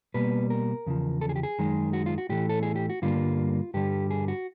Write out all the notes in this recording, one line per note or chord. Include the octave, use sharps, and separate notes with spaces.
B2 G3 A#3 B4
A#4
E2 C#3 F3
A4
G#4
G4
G#4
F#2 D#3 G#3
F#4
F4
F#4
A2 E3 A3 G4
A4
G#4
G4
F#4
G2 D3 G3 A#3 F4
G2 D3 G3 G4
G#4
F#4